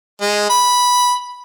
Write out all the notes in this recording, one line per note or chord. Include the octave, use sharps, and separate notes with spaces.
G#3
B5